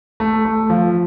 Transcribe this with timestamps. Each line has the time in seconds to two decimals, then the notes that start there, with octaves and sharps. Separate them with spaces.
0.20 A3
0.45 A3
0.70 F3